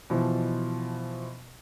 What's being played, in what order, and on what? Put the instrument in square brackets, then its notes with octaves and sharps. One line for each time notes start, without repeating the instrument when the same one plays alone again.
[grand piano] B2 E3 F3